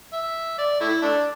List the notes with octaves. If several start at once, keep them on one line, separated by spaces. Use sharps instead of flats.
E5
D5
A3 E4
A3 D4